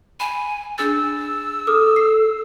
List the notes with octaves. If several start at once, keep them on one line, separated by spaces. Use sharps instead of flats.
G#5 B5
D4 G#4 E6 A6
A4 D6 D#6 F6
C7